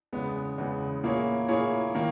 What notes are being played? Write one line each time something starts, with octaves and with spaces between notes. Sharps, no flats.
E2 C#3 G#3 B3
E2 C#3 G#3 B3
A#2 A#3 E4 G#4 C#5
A#2 A#3 E4 G#4 C#5
D#3 A#3